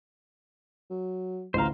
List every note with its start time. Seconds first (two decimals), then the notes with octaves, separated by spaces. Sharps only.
0.90 F#3
1.54 A1 D2 C5 F5 A#5